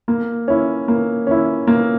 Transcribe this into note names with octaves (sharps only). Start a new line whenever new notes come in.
A#3
C#4 E4
A#3
C#4 E4
A#3